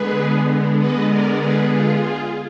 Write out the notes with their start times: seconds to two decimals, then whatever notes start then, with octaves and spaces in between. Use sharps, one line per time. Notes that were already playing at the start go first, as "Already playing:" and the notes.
Already playing: D3 G#3 B3 G#4 B4
0.79 B4 D#5
1.10 A#4 D5
1.41 G#4 B4
1.71 F4 G#4